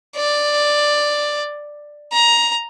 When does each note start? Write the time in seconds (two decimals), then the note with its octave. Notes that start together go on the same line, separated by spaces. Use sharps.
0.16 D5
2.12 A#5